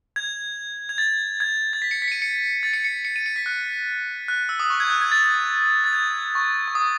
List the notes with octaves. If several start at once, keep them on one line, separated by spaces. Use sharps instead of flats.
G#6
G#6
A6
G#6
A6
B6
C#7
B6
C#7
D#7
C#7
A6
C#7
C#7
C#7
D#7
C#7
B6
F#6
F#6
E6
D#6
C#6
G#6
F#6
G#6
A6
A6
G#6
C#6
C#6
D#6